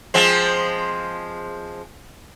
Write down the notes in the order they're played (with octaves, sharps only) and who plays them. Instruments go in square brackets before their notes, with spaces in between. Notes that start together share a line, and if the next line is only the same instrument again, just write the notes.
[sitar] F3 G#3 C4